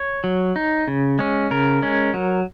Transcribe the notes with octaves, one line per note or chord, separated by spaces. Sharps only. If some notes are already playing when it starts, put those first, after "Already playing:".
Already playing: C#5
F#3
D#4
C#3
G#3 C#4
C#3 A#4
G#3 C#4
F#3